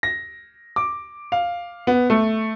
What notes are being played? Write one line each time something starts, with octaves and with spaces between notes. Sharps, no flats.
A#6
D6
F5
B3
A3